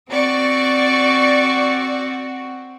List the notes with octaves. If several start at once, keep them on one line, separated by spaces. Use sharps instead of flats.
C4 F#4 D5 C#6